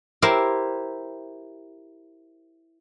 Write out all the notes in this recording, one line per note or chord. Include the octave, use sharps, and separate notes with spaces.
E4 G4 A#4 C5